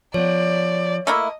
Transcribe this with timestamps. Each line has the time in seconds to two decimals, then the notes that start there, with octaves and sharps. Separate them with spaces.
0.14 F3 B3 C#5 D5
1.07 A3 A#3 E4 D#5